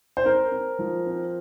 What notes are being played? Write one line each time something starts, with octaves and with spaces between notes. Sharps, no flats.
C5
C4 A#4
C4
F3
C4